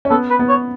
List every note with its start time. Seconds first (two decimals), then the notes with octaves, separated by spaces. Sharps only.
0.05 C#4
0.10 B3 A4
0.30 B4
0.39 B3
0.49 C#5